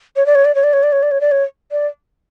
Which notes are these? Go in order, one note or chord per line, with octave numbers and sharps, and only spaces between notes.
C#5
D5
C#5
D5
C#5
D5
C#5
D5
C#5
D5
C#5
D5
C#5
D5